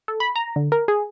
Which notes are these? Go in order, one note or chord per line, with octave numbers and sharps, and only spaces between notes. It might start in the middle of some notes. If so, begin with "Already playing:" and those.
A4
B5
A#5
D3
A#4
G#4